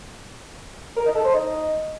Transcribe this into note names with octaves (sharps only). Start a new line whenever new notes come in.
A#4
D#4
A4
C5
D#4